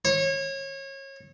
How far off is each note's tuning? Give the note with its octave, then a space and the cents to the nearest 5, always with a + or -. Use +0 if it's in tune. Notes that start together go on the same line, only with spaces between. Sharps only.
C#5 -30